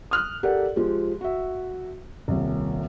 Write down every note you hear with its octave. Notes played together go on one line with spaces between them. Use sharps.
D#6 F6 F#6
G4 A4 A#4 D5 F#5
F3 G#3 G4
F#4 E5
D#1 C2